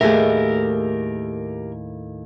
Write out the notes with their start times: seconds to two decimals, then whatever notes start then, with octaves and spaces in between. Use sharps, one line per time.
0.01 D#2 A2 G4 G#4 A#4 E5